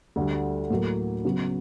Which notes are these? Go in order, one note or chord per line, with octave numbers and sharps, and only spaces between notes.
D2 D3 G3
A2 F#3 A#3
C#3 F#3 B3